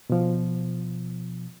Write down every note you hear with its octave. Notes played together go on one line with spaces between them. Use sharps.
B2 F3